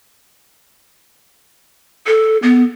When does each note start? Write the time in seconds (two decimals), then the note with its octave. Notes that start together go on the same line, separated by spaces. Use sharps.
2.07 A4
2.43 B3